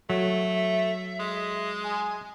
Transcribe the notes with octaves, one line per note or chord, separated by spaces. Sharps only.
F#3 A3
E5
G#3
G#5